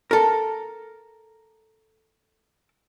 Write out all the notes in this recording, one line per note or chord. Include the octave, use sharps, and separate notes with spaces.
A4 A#4